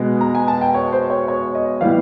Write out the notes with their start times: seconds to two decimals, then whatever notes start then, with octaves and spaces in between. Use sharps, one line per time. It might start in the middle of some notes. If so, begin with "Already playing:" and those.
Already playing: B2 G#3 B3
0.21 A#5
0.35 G#5
0.48 A5
0.61 G5
0.74 C#5
0.92 C5
1.10 C#5
1.28 C#5
1.55 D#5
1.81 A2 E3 G3 B3 F5